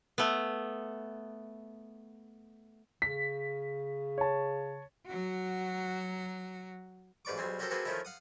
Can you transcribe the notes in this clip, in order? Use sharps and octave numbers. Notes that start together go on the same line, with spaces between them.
A3 B3
C#3 B6
C#5 A5
F#3 F#4
A1 G#2 B4 D5 C#6 D6
B1 G3 C4 G#4
C#4 F#4 G4 A4 A#4 C5
A#3 C4 F#4 G#4 A4 B4
D#3 F3 A3 C#4 D#4 E4
F5 F#5 D#6